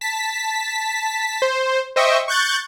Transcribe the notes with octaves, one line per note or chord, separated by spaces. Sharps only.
A5 B6
C5
C5 D#5 E5 G5 C#6
C#6 F#6 G6 A6